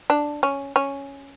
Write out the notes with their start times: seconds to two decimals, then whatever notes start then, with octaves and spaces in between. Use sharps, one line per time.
0.10 D4
0.43 C#4
0.76 C#4